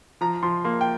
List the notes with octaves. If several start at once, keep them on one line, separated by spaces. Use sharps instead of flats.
F3 A#5
F3 C6
A#3 C6
G5